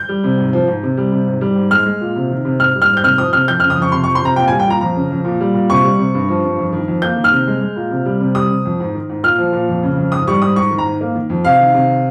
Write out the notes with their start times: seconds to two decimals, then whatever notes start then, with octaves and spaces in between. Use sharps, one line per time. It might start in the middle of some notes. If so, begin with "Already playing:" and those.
Already playing: G6
0.09 G3
0.24 C3
0.38 G#2
0.53 F3
0.67 G#2
0.83 C3
0.98 G3
1.12 C3
1.27 G#2
1.41 G3
1.56 G#2
1.71 G#3 F6
1.86 G#3
2.01 A#2
2.16 C3
2.30 D#3
2.45 C3
2.60 G#2 F6
2.75 G3
2.82 F6
2.90 G#2
2.97 G6
3.03 C3 F6
3.18 F3 D#6
3.33 C3 F6
3.48 F2 G6
3.60 F6
3.63 C#3
3.70 D#6
3.77 F2 C#6
3.92 C3 C6
4.04 C#6
4.07 F3
4.15 C6
4.22 C3 A#5
4.36 A#2 G5
4.48 G#5
4.52 G3
4.60 G5
4.67 A#2 A#5
4.81 F2 A#5
4.96 C#3
5.11 F2
5.25 A#2
5.41 G3
5.54 A#2
5.70 C3 C#6
5.84 G3
5.99 C3
6.14 G2
6.29 F3
6.44 G2
6.58 F2
6.73 D#3
6.88 F2
7.02 A#3 G6
7.17 D#3
7.24 F6
7.32 C3
7.47 G#3
7.61 G#3
7.76 A#2
7.91 C3
8.06 G3
8.21 C3
8.35 G3 D#6
8.50 C3
8.65 F2
8.80 G#2
8.94 D#3
9.09 G#2
9.23 A#2 F6
9.38 F3
9.53 A#2
9.69 F2
9.83 C#3
9.97 F2
10.12 G#2 D#6
10.28 G3 C#6
10.42 G#2 D#6
10.56 G#2 C#6
10.71 D#3
10.78 A#5
10.86 G#2
11.01 A#3
11.15 D#3
11.30 F2
11.45 C3 F5
11.60 D#3
11.74 C3